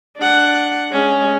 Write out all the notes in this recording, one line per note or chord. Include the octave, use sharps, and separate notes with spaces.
D4 F#5
G#3 C#4